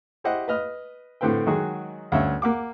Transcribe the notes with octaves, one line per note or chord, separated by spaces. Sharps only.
E4 G4 C5 D#5 F#5
B4 D#5 F6
A2 D3 C4 B4 G5
D#3 F#3 G#3 F#4 G#4
D2 G2 C#4 E5
A#3 F#5 D6